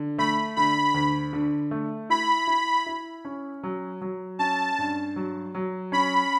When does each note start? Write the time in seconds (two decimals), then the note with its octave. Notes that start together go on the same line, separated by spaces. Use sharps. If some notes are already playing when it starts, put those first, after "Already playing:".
Already playing: D3
0.18 A3 B5
0.56 D3 B5
0.94 D2
1.33 D3
1.71 A3
2.10 E4 B5
2.47 E4
2.86 E4
3.25 C#4
3.63 F#3
4.01 F#3
4.39 C#4 A5
4.78 G2
5.16 F#3
5.55 F#3
5.92 C#4 B5